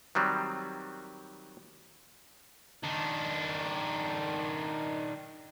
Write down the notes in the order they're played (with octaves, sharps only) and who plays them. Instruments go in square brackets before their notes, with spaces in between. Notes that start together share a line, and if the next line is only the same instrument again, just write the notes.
[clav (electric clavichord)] D#3 F#3 G3 C4
[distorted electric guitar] D#3 D4